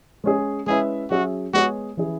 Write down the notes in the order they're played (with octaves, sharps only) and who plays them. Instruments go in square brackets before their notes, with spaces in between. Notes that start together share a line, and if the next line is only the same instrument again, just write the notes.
[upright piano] G#3 C#4 G#4
[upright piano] G#3 C#4 E4 B4 E5 [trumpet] G#4
[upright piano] F#3 C#4 G#4 E5 [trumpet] F#4
[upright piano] G#3 B3 G#4 C#5 [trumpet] F#4
[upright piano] E3 C#4 E4 G#4